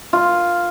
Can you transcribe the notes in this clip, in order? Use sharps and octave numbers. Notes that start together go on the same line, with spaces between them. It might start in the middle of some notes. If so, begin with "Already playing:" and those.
F4